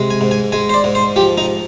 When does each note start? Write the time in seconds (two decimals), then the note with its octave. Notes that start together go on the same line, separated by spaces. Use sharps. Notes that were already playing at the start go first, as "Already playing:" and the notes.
Already playing: C3 G#3
0.10 G#5
0.21 G#2
0.31 G#5
0.52 G#3 G#5
0.69 C5
0.74 D5
0.84 G#2
0.95 C5
1.16 F3 G4
1.38 D#4